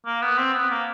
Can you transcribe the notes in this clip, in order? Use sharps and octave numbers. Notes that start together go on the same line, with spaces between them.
A#3
B3
C4
B3
A#3